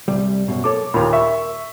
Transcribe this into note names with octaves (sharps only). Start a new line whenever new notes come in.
C2 G3
F#2 B2
A#3 A4 C#5 D6
D#2 A#2 A#4 B5
E5 C#6